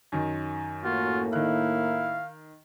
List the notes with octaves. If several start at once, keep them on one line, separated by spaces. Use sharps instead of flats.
F#2 D#3
A2 A#3 F4 F#4
D#3 E4 F5 F#6